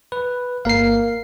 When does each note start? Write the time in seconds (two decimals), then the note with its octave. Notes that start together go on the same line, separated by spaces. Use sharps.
0.12 B4
0.65 G1 A#3 A#4 F5 C7